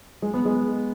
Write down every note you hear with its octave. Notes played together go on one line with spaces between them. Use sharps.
G#3
B3
G#3